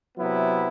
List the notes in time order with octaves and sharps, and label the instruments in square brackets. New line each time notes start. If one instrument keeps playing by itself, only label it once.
[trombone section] C3 F#3 B3 E4